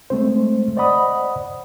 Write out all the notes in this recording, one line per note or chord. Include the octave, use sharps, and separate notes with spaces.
G#3 A3 C4 C5
C5 D5 D#5 F#5 B5 D#6